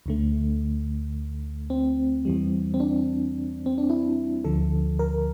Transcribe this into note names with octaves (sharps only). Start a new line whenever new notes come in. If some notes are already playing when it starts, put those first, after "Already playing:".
D2 D3 A3
C4
E2 E3 G3
C4
D4
C4
D4
E4
D2 D3 F3 A4
A#4